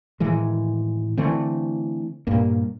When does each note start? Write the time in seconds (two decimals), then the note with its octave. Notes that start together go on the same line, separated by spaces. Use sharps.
0.20 A2 D#3 E3 G#3
1.17 D3 E3 A3 C4
2.27 G2 A#2 A#3